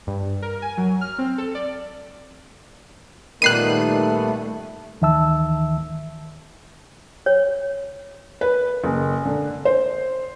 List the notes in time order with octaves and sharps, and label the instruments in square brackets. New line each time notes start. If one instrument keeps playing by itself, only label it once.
[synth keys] G2
A#4
G#5
F#3
F6
C4
A4
D5
[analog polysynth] A#2 G3 B3 [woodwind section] D#3 [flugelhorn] A3 [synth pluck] F#6 C7 D#7
[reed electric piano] D2 D#3 E3 E5 A5 E6
[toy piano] C#5
[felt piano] B4
F#1
D3
C5